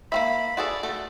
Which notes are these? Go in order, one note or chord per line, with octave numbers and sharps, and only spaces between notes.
A#3 C4 E5 B5
F#4 G#4 A4 D5
A3 A4